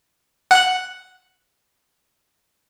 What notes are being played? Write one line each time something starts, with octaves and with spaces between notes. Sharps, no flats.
F#5 F#6